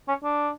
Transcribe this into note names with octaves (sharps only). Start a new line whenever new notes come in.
C#4
D4